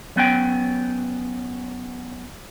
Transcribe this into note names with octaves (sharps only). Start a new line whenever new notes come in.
F#3 B3 C#4 G5